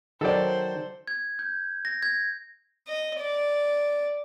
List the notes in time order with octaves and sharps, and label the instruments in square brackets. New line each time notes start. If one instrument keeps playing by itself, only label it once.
[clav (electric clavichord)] D#3 F#3 [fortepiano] A4 D5 [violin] C5
[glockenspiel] G#6
G6
A#6
G#6
[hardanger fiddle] D#5
D5